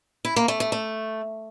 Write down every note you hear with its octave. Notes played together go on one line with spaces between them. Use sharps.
E4
A#3
A3
A3
A3